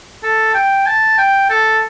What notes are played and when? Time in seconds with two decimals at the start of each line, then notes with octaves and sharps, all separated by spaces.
0.23 A4
0.55 G5
0.86 A5
1.18 G5
1.50 A4